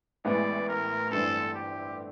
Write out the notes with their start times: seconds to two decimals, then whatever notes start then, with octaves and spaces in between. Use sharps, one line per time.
0.24 A1 A2 E3 G#3 B3 D5
0.68 A#4
1.10 G1 G2 E3 A3 C4 A4
1.54 G4